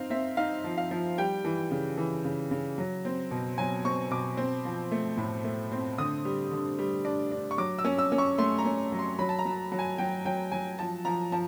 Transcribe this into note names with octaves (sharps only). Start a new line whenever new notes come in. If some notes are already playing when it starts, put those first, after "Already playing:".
Already playing: C4 D#4 F5
C4 E5
D#4 F5
F3
F5
F3
G3 G5
E3
C#3
E3
C#3
C#3
F#3
C4
B2
F#3 G#5
C4 C#6
B2 D6
C4
F3
A3
A2
A3
C4
D3 D#6
G3
D3
G3
D4
D4
C#6
F#3 D6
E6
C#4
E6
C#4
C#6
A3 C6
A#5
C#4
F#3
C6
F#3 B5
A5
A#5
F#3
F#3
G#5
F#3 G5
F#3 G5
F#3 G#5
F3 A5
F3 A#5
F3 A5